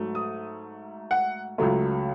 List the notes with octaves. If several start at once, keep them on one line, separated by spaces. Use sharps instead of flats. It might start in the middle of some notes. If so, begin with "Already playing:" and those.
Already playing: G#2 F#3 A3
D#6
F#5
C#2 C#3 F#3 A3